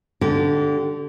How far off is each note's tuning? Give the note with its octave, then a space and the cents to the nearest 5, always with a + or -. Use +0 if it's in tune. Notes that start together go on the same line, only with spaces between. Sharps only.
D3 -5 G4 -35